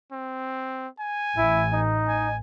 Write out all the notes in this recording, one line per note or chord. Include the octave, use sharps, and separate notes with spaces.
C4
G#5
A1 E4
D#4
G#5